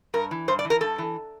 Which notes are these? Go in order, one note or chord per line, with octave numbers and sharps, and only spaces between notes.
G2 A#4
E3
G2 C5
D5
E3
A#4
G2 A4
E3